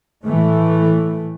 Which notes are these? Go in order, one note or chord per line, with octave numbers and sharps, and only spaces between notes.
A2 E3 A3